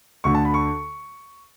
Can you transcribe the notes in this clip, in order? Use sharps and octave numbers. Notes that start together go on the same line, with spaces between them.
D2 D3 A3 C#6
A5
B5
C#6